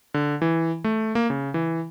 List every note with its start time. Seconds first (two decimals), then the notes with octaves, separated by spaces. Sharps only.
0.14 D3
0.42 E3
0.84 A3
1.15 A#3
1.30 C#3
1.54 E3